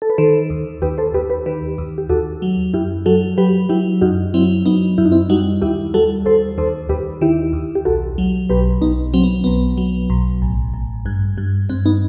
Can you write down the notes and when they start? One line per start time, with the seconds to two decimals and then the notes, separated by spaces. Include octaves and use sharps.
0.02 A4
0.10 B4
0.18 D#3 A4 C5
0.50 D#2
0.82 D#2 G4 B4
0.98 A4 C5
1.14 D#2 G4 B4
1.30 G4 B4
1.46 D#3 G4 B4
1.78 D#2
1.98 G4
2.09 D#2 F#4 A4
2.42 F#3
2.74 F#2 E4 G4
3.06 F#3 F#4 A4
3.38 F#3 G4 B4
3.69 F#3 E4 G4
4.01 F#2 D#4 F#4
4.34 F#3 C4 E4
4.65 F#3 B3 D#4
4.98 F#2 E4
5.05 D#4
5.12 C4 E4
5.29 G3 D#4 F#4
5.62 D#2 E4 G4
5.94 G3 F#4 A4
6.25 D#2 A4 C5
6.58 D#2 A4 C5
6.89 D#2 G4 B4
7.21 D#3 E4 G4
7.53 D#2
7.75 G4
7.85 B1 F#4 A4
8.18 F#3
8.49 B1 G4 B4
8.81 B1 B3 D#4
9.14 F#3 C4
9.24 B3
9.44 B1 B3
9.78 F#3
10.10 B1
10.42 A1
10.74 A1
11.06 G2
11.38 G2
11.69 G2 C4
11.85 B3 D#4